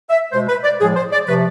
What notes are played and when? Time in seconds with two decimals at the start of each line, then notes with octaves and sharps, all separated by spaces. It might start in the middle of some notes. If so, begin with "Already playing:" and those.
0.10 E5
0.32 B2 G#3 C5
0.48 B4
0.64 D5
0.79 A2 F3 G#3 G#4
0.96 C5
1.12 D5
1.28 C3 F3 A3 B4